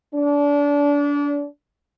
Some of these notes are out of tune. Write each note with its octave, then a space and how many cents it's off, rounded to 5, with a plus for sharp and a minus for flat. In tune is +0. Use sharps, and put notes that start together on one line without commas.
D4 -30